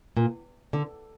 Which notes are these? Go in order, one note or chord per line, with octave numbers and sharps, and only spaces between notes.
A#2
D3